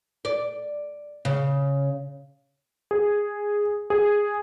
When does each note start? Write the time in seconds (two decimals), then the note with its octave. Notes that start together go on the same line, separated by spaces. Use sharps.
0.25 D5
1.25 C#3
2.91 G#4
3.90 G#4